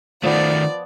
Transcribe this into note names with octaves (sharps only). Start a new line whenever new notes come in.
D#3 F3 A3 B3 D5 A5